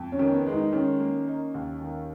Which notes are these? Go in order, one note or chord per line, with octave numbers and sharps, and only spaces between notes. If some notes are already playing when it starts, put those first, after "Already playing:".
Already playing: F2
C#4
D#3
B3
G#3
D#4
D#3 C#4
A#3
D#4
D#2
D#3